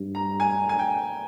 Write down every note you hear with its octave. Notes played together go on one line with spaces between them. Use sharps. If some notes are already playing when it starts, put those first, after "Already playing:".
Already playing: G2
A#5
G#5
G#5
G5